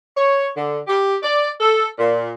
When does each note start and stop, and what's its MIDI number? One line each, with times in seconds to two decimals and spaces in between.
0.16 0.47 73
0.57 0.79 50
0.88 1.15 67
1.23 1.50 74
1.60 1.87 69
1.99 2.30 46